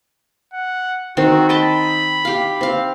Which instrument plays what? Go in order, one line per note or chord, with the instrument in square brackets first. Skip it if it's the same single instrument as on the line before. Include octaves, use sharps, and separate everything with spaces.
[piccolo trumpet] F#5
[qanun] D#3 C4 [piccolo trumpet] F#4
[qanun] D#5 G5 A5 [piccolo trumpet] B5
[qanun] G4 F5
C4 F5